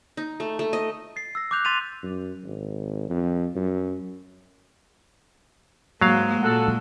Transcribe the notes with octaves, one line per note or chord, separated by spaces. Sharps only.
D#4
A3
A3
D#5
A6 C7
E6 A#6
D6 E6 F#6 G6 F7
C6 A6 B6 D#7 F7
F#2
G#1
F2
F#2
G#2 F#3 G#3 A#3 F5
A#2 G#3 F#4 A4